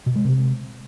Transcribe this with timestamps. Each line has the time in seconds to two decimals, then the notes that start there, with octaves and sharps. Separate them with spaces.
0.06 B2
0.16 G#3
0.25 C3